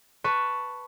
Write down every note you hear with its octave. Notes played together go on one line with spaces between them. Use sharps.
B4 A5 C#6